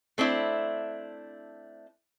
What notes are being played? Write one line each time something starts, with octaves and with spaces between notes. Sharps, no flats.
A3 C4 D4 E4